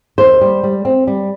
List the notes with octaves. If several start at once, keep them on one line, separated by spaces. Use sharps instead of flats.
D#2 C5
G3
G3
C4
G3